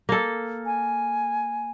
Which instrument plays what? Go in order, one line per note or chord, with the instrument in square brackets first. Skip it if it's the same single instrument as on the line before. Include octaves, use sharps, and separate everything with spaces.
[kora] A#3 A4
[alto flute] G#5